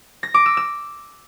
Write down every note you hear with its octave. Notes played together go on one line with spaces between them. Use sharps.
A#6
D6
E6
E6